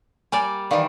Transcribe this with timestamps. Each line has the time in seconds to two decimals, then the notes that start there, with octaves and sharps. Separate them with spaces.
0.32 G3 A#3 D5 G#5
0.71 D#3 E3 A#4 D5 F5